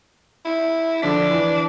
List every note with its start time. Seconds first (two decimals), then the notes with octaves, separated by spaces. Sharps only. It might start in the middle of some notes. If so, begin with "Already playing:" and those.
0.45 E4
1.02 D3 F3 D4 B6
1.30 E3